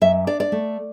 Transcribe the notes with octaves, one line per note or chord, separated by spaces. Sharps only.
F#2 E5
D4 D5
D5
A3